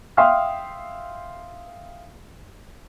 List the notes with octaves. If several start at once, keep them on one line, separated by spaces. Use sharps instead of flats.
E5 F5 G5 C6 D#6 F6